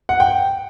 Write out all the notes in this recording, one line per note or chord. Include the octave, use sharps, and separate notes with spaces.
F#5
G5